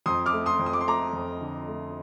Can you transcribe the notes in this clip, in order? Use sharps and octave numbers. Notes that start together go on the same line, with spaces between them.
F2 C6 D#6
D6 F6
A3
C6 D#6
F2
D#6
D6
C6
A3 A#5 D6
F2
D3
A3